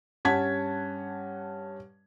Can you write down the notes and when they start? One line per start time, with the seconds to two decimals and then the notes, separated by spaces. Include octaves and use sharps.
0.25 G2 C#4 F#5 A5 G#6 B6